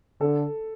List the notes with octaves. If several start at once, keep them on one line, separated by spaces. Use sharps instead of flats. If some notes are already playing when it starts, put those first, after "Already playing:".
D3 A4